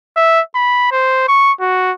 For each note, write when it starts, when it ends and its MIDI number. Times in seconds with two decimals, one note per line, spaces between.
0.16 0.41 76
0.55 0.87 83
0.92 1.28 72
1.28 1.52 85
1.60 1.92 66